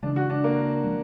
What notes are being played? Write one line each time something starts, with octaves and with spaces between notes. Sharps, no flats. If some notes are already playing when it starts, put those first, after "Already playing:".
C#3 E3 G#3 D4
F#4
D4
A#3
F3 G#3